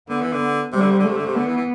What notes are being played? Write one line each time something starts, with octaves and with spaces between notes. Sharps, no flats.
D3 B3
E3
D3
C3 G3
D3
C3
D3
C3 A3
D3
C3
D3 B3
E3
E3